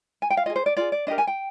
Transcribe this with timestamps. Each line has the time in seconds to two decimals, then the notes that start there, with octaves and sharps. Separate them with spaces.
0.22 G#5
0.30 G5
0.37 F5
0.46 F4 G#4 D#5
0.56 C5
0.66 D5
0.77 F4 G#4 D5
0.92 D5
1.07 D4 G4 A#4 D#5
1.18 G#5
1.27 G5